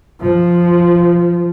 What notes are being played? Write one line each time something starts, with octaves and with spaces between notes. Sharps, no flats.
F3